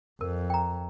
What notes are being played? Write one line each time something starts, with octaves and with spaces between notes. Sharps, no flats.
F2 A#4
G5 A#5